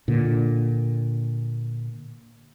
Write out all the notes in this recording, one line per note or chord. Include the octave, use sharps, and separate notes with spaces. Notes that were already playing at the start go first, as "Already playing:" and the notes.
A#2 D3